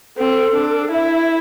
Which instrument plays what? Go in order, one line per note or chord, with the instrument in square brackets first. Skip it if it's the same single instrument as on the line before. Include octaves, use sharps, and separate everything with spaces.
[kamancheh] C4 [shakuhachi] A4
[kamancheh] D4
[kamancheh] E4 [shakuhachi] E5